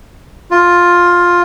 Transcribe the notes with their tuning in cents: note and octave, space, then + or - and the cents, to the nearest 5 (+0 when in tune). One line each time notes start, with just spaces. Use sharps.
F4 +10